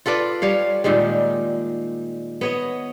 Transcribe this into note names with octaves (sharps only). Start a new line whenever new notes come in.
F4 A4 B4 D5
G3 C#5 F5
A#2 D#3 G3 G#3
B3 C#5 D#5